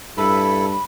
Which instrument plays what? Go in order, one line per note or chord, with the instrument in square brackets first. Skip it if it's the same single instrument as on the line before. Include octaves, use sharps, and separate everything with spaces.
[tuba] G2 [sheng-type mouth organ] E4 A4 [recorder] B5